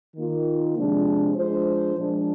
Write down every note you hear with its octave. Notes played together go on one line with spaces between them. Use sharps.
D#3 A#3 F4
C3 F3 G#3 D4
F3 G#3 D4 F4 C5
A#2 F3 G#3 D4